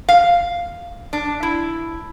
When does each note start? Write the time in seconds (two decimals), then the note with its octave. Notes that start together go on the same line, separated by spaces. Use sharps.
0.09 F5
1.13 D4
1.43 E4